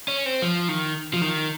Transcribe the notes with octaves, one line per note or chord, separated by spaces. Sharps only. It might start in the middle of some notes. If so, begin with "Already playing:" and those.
C#4
C4
F3
D#3
F3
D#3